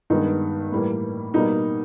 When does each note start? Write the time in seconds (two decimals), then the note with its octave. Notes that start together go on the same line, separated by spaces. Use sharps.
0.10 G2 D#3 G#3 B3 D#4
0.72 A2 E3 G3 A#3
1.34 B2 G3 A#3 D#4